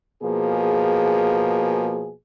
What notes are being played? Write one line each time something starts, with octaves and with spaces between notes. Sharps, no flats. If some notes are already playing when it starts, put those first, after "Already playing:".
B2 F3 A#3 G#4